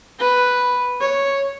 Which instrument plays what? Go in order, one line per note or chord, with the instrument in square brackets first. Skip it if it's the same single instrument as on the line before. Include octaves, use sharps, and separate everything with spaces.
[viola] B4
C#5